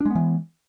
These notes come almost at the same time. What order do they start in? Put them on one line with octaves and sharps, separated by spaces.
D4 G#3 B3 E3